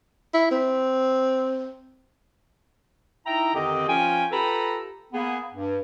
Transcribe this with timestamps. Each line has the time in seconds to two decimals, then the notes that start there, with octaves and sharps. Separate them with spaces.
0.34 E4
0.51 C4
3.25 D#4 E4 E5 G5 A#5
3.54 F2 D3 D#3 C4 G4 D#5
3.88 F3 C#4 F4 G5 G#5
4.32 F4 G4 A4 B4 A#5 B5
5.13 A#3 B3 G#4
5.55 G2